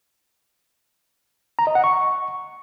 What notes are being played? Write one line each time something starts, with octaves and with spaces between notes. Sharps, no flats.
A#5
D#5
F#5
C#6